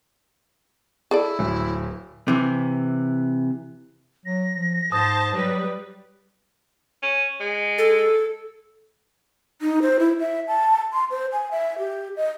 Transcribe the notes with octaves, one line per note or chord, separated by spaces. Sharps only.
E4 G#4 A4 D5
D1
C3 E3
F#3 A#6
F3
G#2 C5 A5 D#6
F#3 G3 B4
C#4
G#3
A4
D#4
C5
E4
E5
A5
C6
C5
G#5
E5
G4
D#5